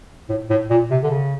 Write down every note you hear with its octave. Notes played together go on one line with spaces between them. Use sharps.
A2
A2
A#2
C3
D3
C#3